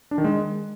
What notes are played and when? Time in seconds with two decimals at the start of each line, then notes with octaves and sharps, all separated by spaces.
0.11 D4
0.18 D#3
0.24 G#3